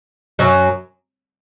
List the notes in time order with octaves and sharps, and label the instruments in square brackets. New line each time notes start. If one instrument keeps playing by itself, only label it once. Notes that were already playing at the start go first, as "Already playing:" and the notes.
[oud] F#2 F#3